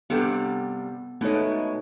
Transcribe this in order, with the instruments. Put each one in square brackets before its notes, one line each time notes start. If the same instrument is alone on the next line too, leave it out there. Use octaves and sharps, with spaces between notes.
[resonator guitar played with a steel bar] G2 C3 G3 [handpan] B3 A4 F#5
[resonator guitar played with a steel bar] B2 G#3 [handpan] A3 D#4 C#5